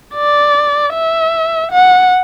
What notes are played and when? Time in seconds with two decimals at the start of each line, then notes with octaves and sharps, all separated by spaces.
0.14 D5
0.93 E5
1.72 F#5